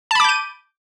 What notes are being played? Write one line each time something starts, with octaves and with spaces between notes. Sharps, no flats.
A5 B5 D6 G6 D#7